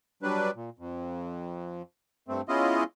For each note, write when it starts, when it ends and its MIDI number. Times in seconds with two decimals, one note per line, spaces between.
0.23 0.51 54
0.23 0.51 55
0.23 0.51 62
0.23 0.51 71
0.56 0.70 46
0.79 1.82 41
2.28 2.41 43
2.28 2.41 57
2.28 2.41 60
2.49 2.84 56
2.49 2.84 59
2.49 2.84 61
2.49 2.84 64
2.49 2.84 65
2.49 2.84 75